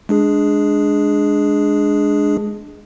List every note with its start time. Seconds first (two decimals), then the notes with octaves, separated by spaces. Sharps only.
0.09 G#3 D4 G#4